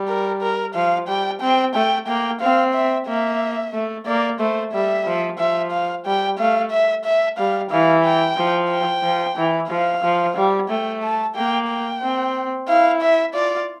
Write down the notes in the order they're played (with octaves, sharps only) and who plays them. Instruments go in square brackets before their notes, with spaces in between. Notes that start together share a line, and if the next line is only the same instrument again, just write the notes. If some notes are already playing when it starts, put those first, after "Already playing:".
Already playing: [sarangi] G3
[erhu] A#4
A#4
[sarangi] F3 [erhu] F5
[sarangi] G3 [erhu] G5
[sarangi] C4 [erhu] G5
[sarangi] A3 [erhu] G5
[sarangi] A#3 [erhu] G5
[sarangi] C4 [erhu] F5
[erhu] E5
[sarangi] A#3 [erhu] E5
[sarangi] A3
[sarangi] A#3 [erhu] D5
[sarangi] A3 [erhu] C5
[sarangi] G3 [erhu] E5
[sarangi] F3
[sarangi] F3 [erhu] E5
[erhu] F5
[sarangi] G3 [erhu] G5
[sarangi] A3 [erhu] F5
[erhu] E5
E5
[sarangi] G3 [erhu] F5
[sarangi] E3 [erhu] F5
[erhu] G5
[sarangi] F3
[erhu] G5
[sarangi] F3
E3
[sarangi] F3 [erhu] F5
[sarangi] F3
G3
[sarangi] A3 [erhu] G5
[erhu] A5
[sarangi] A#3 [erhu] G5
[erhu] G5
[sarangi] C4
[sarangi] E4 [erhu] F5
[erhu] E5
[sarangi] F4 [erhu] D5